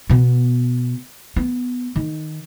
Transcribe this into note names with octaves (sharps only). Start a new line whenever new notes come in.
B2 B3
B3
D#3